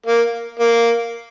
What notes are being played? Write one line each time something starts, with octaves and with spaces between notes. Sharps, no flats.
A#3
A#3